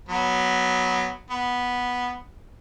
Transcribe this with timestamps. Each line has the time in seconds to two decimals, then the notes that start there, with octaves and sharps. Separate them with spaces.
0.09 F#3 B3
1.30 B3